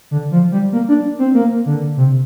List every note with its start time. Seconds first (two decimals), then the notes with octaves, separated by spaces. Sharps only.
0.11 D3
0.31 F3
0.52 G3
0.72 A#3
0.88 D4
1.19 C4
1.34 A#3
1.66 D3
1.97 C3